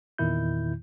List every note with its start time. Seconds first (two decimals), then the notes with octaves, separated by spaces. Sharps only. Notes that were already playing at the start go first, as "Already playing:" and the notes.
0.18 E2 A#2 D#3 E4 G6